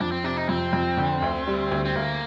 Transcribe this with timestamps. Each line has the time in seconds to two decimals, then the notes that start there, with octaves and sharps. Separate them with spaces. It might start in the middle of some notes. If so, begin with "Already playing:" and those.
0.01 F2 D4
0.12 C4
0.24 C3 D4
0.37 D#4
0.49 F2 C4
0.73 F2
0.97 D3
1.22 D2
1.47 G3
1.71 D2
1.85 C4
1.95 D2 A#3